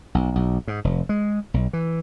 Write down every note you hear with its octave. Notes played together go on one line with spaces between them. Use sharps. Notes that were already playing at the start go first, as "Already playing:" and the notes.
B1
B1
G#2
F1
G#3
B1
E3